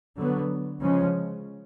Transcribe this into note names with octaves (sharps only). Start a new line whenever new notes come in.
D3 F#3 B3
C#3 F3 G#3 C#4